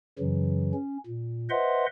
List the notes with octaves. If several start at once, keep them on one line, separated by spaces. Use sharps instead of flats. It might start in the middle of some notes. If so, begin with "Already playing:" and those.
F#2 C#3 E3 F#3
C#4
A#2
B4 C5 D#5 E5 F#5 C6